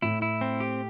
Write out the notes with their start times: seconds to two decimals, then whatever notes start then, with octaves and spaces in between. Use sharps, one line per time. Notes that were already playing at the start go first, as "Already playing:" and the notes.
0.02 A2 A3 E4
0.22 E4
0.41 C4
0.60 G4